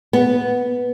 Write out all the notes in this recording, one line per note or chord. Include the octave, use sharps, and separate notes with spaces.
B3